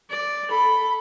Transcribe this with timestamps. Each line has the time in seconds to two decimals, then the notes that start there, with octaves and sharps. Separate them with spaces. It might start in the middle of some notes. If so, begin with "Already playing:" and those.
0.10 D5
0.51 A4 B5